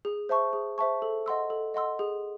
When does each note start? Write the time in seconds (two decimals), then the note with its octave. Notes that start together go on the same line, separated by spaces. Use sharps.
0.05 G#4
0.29 C5 E5 A5 C#6
0.53 G#4
0.78 C5 E5 A5 C#6
1.02 A4
1.26 D#5 F#5 C6 E6
1.50 A4
1.74 D#5 F#5 C6 E6
1.99 G#4